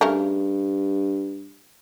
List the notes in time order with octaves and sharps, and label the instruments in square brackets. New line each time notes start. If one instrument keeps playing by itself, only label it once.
[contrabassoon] G2 [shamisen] C#3 A3 A#4